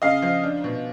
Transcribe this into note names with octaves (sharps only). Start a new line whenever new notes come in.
C#3 D#5 F5
F3
D4
B2